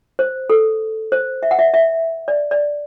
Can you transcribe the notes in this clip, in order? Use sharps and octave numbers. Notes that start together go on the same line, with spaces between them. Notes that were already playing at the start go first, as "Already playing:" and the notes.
C5
A4
C5
E5
F#5
E5
E5
D5
D5